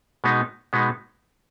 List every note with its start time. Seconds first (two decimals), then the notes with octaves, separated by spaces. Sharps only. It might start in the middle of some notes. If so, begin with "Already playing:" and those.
0.24 B2 G#3 B3 D#4
0.73 B2 G#3 B3 D#4